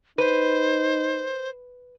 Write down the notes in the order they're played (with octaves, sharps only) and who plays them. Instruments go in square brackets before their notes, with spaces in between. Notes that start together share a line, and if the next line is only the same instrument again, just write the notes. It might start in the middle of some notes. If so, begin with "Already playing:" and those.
[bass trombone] D#4 [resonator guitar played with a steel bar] B4 [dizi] C5